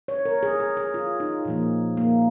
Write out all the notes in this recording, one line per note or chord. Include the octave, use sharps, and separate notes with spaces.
C#5
A#4
G#4
G#4
G#4
F4
D#4
A#2 F3 A#3
A#3